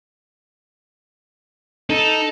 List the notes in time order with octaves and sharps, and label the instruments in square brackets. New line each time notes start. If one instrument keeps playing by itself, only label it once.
[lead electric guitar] D#4 [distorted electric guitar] A4